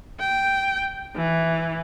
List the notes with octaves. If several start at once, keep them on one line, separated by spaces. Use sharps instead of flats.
G5
E3